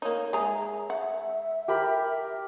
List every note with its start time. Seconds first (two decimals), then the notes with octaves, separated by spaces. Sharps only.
0.02 A#3 D#4 C#5
0.33 G#3 G#4 E5 A#5
0.90 F#5
1.68 G4 A#4 B5